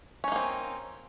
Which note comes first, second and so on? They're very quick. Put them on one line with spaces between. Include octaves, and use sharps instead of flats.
C#4 D#4 A#3 C4